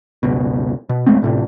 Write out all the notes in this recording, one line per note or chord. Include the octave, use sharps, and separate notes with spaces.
F#1 C#2 B2
B2
D1 G#3 A3 C4
A1 A2 C3